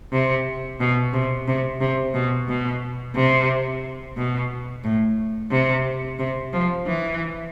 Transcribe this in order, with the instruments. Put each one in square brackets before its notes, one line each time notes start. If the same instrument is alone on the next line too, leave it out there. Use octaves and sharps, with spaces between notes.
[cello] C3
B2
C3
C3
C3
B2
B2
C3
B2
A2
C3
C3
F3
E3